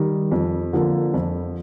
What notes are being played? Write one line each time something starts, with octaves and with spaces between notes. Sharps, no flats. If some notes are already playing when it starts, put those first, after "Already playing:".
Already playing: D#3 G3
F2
D3 F3 A#3
F2